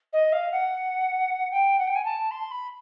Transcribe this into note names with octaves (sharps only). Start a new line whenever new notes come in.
D#5
F5
F#5
G5
F#5
G5
G#5
A5
C6
B5